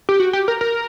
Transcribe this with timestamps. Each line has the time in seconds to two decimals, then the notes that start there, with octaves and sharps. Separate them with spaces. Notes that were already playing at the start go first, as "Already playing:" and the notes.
0.09 G4
0.20 F#4
0.33 G4
0.48 A#4
0.61 A#4